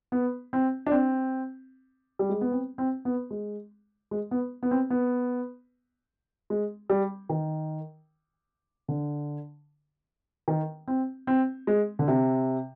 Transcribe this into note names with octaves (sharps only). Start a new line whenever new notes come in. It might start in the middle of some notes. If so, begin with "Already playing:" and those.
B3
C4
D4
C4
G3
G#3
B3
C4
C4
B3
G#3
G#3
B3
B3
C4
B3
G#3
G3
D#3
D3
D#3
C4
C4
G#3
D3
C3